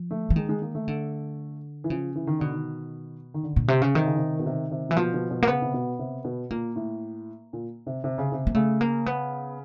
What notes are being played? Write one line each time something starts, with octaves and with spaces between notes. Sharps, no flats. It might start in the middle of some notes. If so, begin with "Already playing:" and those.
Already playing: F3
A3
E3
D#3 G#3
G#3
A#3
A3
D3
E3
C#3 F3
E3
D#3
B2 D3
D#3
D#3
D3
A#2
C3
C#3
C3 D#3
C#3
C3
B2
C3
C3
A#2 E3
B2 F3
B2
B2
A#3
C#3 B3
C3
B2
C3
B2
A#2 A#3
A2
A#2
C3
C3
C#3
C3
A#3
C#3 A3
A#3
B3